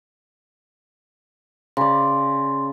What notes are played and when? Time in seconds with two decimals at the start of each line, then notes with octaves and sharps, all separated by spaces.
1.77 C#3 D5 C6